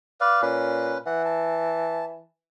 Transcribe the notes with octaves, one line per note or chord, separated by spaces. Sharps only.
B4 D5 F5
A#2 C#4 B4
E3 F#5
A5